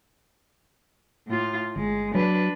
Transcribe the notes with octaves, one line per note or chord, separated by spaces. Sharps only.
A2 F4
G1 G#3
F#3 D4 B4